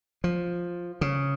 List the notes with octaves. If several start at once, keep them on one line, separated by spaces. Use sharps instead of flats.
F3
C#3